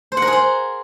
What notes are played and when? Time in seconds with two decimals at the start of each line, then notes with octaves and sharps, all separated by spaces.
0.12 C5
0.17 F#5
0.22 A#4
0.27 G#4
0.33 C5